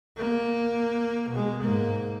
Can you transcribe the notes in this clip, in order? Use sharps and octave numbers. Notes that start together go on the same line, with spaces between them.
A#3
B2 G#3
G#2 A#3